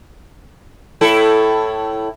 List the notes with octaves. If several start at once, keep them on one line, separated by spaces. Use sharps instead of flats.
A2 E4 A4